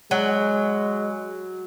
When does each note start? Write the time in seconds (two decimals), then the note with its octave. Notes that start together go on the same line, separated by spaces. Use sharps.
0.11 F#3 G#3